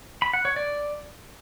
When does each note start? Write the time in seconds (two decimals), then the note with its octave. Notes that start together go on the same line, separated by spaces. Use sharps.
0.22 B5
0.33 F#5
0.45 C#5
0.56 D5